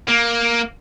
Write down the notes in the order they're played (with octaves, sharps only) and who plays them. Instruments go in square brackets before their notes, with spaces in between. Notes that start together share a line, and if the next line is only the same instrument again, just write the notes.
[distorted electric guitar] A#3